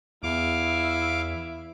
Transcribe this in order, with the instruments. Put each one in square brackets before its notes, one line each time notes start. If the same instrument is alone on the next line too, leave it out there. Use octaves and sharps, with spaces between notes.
[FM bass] E2 [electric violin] E4 E5 [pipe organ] F5 D6